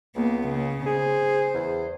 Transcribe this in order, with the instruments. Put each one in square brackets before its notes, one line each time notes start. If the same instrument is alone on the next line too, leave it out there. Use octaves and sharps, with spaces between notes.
[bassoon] C#2 [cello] A#3 B3
[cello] C#3
[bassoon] G#4 [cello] C5
[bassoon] E2